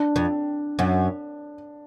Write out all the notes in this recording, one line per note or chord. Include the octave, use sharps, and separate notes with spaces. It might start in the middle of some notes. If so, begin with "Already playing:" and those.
Already playing: D4
F2
F#2